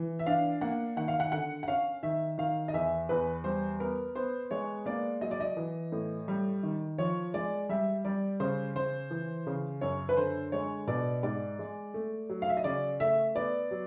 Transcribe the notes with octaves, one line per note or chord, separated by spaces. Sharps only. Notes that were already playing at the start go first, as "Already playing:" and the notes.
Already playing: E3
E5
D4 F5
A#3 F#5
D#3 F#5
F5
F#5
D3 F#5
F#5
C#4 F5
D#3 E5
D#3 F5
D#5
E2 E5
E2 B4
G3 C5
B3 A#4
B3 C5
G#3 C#5
A#3 D5
F#3 D#5
D5
D#5
E3
A2
G3
D#3
F3 C#5
G#3 D5
G3 E5
G3 D5
C#3 C5
C#3 C5
E3
C#3
F#2 C#5
B4
D3 C5
G#3 C#5
B2 D5
G#2 D5
G#3
A3
F#3
F5
E5
D#5
C#3 D5
A3 E5
B3 D5
F#3